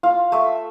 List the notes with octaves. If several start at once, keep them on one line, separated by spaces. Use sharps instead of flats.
F4 F5
A3 E5